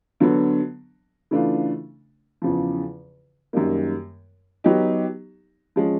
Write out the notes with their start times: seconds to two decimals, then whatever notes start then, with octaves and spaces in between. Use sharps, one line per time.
0.20 D3 F#3 B3
1.31 C#3 E3 A3 D4 F4
2.42 E2 C#3 F3
3.53 F#2 D#3 G3 A#3
4.64 F#3 B3 D#4 G4
5.76 F3 G#3 C#4